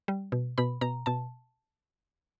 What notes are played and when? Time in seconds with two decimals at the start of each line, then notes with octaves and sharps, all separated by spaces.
0.08 G3
0.32 B2
0.58 B2 B5
0.81 B2 A#5
1.06 B2 A5